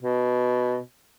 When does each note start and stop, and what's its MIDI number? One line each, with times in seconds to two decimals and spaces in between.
0.03 0.78 47